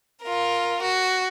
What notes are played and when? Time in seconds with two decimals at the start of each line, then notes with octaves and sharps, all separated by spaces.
0.23 F4 A#4
0.82 F#4